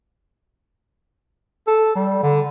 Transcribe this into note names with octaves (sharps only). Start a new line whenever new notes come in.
A4
G3
D3